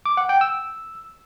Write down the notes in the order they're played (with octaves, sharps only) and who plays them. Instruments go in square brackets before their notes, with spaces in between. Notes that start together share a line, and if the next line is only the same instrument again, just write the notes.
[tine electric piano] D6
F#5
G5
E6